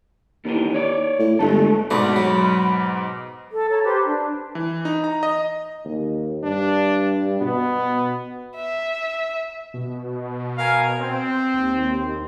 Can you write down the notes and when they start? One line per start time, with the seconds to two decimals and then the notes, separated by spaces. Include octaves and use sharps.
0.45 D#2 B2 D#3 E3
0.74 C#5 D5
1.19 A2
1.39 G1 G#3 A3 A4
1.91 G#2 B2 A3 D4 B5 D6
2.16 F#3
3.52 A4
3.69 A4 C#5 A#5
3.84 G4 B4 C5
4.04 D4
4.55 E3
4.85 D#4
5.04 A#5
5.23 D#5
5.85 D#2
6.43 G2 D4
7.41 B2 B3
8.56 E5
9.74 B2
10.58 A#4 F5 G#5
10.99 C4
11.54 D#2